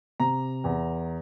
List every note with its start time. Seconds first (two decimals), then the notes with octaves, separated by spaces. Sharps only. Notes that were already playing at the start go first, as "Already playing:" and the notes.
0.20 C3 A#5
0.64 E2